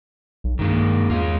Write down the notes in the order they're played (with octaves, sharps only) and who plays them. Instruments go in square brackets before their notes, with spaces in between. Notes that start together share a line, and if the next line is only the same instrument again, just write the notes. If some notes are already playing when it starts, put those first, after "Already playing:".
[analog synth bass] B1
[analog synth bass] G2 [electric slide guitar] D#3 G#3 A#3
[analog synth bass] E2 [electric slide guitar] G#3 F4